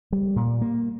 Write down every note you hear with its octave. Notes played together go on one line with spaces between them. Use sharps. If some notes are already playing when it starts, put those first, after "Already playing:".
G3
A#2
A#3